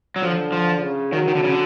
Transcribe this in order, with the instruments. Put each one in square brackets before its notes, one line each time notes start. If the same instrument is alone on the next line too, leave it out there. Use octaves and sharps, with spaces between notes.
[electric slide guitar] F#3
[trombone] D3 [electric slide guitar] F3
[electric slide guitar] F3
[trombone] C#3
[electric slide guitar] D#3 [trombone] F#3
[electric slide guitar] D#3
D3
C#3
D3